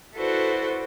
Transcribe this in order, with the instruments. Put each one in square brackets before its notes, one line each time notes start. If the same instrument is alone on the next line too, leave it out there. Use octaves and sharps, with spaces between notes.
[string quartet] E4 F#4 A4 B4 C5 D5